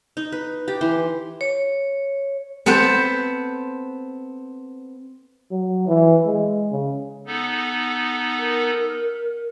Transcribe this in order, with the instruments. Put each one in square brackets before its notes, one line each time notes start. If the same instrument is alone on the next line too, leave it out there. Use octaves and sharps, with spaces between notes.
[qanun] D#4
B4
G4
E3 C6
[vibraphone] C#5
[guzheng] B3 C4 A4 B4 C5
[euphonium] F#3
E3
G#3
C#3
[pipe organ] B3 D#4 A4
[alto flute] A#4